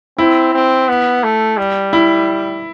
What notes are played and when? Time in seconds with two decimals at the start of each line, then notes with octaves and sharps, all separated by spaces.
0.18 C4 E4
0.54 C4
0.88 B3
1.24 A3
1.58 G3
1.93 E4